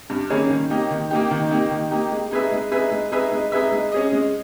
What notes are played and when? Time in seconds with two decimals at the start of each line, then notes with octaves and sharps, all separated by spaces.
0.10 G2
0.30 D#3 A#3 C#4 G#4
0.50 D#3
0.70 A#3 D#4 G4
0.91 D#3
1.11 A#3 D#4 G4
1.31 D#3
1.51 A#3 D#4 G4
1.71 D#3
1.91 A#3 D#4 G4
2.11 G#3
2.31 D#4 G#4 B4 E5
2.52 G#3
2.71 D#4 G#4 B4 E5
2.91 G#3
3.12 D#4 G#4 B4 E5
3.32 G#3
3.52 D#4 G#4 B4 E5
3.72 G#3
3.92 C#4 G#4 D#5
4.12 G#3